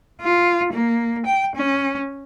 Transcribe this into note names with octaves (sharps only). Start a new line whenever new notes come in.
F4
A#3
G5
C#4